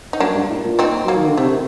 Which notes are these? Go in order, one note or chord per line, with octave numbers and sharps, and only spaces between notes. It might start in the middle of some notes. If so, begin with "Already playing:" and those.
D#4
F#2 A#3 D4
G2
A2
A#2
C4 D#4
F#3 A#3
D#3
D3
C3 A3